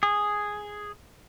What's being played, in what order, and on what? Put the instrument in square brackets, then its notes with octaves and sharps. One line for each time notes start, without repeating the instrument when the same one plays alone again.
[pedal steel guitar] G#4